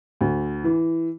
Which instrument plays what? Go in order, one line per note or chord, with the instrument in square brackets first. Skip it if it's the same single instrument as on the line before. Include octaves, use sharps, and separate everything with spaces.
[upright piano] D2
E3